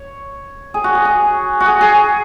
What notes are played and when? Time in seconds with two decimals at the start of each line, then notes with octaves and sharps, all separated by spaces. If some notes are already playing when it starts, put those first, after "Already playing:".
Already playing: C#5
0.74 G#4
0.84 F#4
0.95 G#4
1.05 G#4
1.60 F#4
1.66 G#4
1.81 G#4